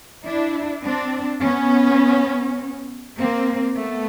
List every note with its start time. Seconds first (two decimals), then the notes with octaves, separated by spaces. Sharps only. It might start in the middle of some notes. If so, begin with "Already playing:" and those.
0.25 D4 E4
0.84 C4 D4
1.41 B3 C#4
3.17 A#3 C4
3.75 A3 B3